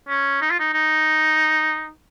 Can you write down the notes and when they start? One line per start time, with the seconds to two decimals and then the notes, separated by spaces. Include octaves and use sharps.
0.08 C#4
0.41 D#4
0.50 F4
0.59 D#4
0.73 D#4